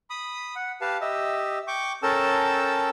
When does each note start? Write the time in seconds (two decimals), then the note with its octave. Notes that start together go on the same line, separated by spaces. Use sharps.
0.10 B5 D#6
0.55 F#5
0.81 G4 B4 F5 A5
1.01 G4 D#5 E5
1.67 G5 C#6 D6
2.03 C#4 A4 A#4 G5 A5 E6